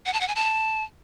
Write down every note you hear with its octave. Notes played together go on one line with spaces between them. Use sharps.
F#5
A5
F#5
G#5
A5